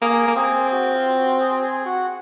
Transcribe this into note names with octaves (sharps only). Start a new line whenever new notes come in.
A#3 G#4
A#3
C4 G#4
F#4
F4
F#4
G#4
G#4
F#4